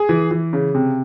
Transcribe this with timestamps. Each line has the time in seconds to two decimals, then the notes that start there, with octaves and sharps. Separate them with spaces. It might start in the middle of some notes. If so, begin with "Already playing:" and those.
Already playing: G#4
0.09 E3
0.31 E3
0.53 C#3
0.75 C3